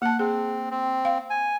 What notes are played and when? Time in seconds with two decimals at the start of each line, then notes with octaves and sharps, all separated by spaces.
0.02 A#3 F#5 A5
0.19 C4 G#4
0.71 C4
1.05 F5
1.30 G#5